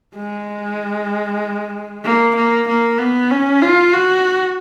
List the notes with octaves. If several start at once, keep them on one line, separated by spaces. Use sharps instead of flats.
G#3
A#3
A#3
A#3
B3
C#4
F4
F#4